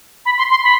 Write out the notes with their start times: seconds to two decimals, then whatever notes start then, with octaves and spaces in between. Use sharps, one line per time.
0.26 B5
0.38 C6
0.50 C6
0.63 B5